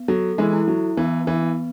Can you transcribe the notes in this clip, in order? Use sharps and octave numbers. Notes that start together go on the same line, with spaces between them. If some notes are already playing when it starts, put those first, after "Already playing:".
Already playing: B3
F#3 A4
E3 G#3
E4
F#3
E3 B3
E3
B3